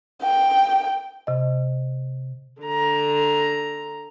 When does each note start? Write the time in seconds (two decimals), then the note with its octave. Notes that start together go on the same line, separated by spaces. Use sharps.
0.23 G5
1.27 C3 D#5
2.62 D3 A#5